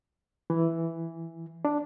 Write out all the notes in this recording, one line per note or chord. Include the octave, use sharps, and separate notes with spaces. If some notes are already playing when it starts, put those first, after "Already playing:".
E3
D4